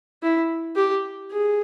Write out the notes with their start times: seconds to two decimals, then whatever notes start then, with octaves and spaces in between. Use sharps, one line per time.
0.23 E4
0.76 G4
1.31 G#4